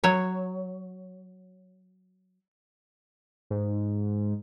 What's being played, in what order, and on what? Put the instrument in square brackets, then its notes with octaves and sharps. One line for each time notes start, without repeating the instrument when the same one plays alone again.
[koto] F#3 C#5
[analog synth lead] G#2